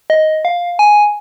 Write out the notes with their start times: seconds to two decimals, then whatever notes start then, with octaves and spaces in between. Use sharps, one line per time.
0.10 D#5
0.45 F5
0.79 G#5